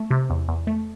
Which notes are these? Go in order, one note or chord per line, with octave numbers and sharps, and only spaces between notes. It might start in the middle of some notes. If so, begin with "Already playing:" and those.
Already playing: A3
C3
E2
E2
A3